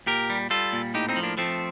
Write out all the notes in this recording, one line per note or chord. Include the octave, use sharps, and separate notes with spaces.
A#2 G4 A#4
G3
G3 F4 A4
A#2
A2 D#4 G4
C4 D#4
F3
A#3 D4
F3 A3 C4